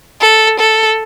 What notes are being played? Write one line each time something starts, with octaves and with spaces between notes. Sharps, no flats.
A4
A4